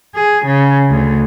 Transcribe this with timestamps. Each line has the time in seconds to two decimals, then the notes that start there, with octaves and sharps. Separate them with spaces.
0.15 G#4
0.45 C#3
0.90 D2